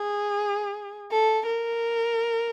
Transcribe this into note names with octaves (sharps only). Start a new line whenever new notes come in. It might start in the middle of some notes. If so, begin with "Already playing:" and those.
Already playing: G#4
A4
A#4